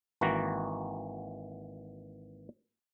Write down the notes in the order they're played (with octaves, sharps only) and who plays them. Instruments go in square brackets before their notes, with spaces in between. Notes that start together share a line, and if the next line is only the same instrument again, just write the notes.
[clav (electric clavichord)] G#1 E3 A#3 F#4 A#5